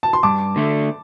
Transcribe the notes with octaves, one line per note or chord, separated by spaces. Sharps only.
A5
C6
G2 A5 D6
D3 A3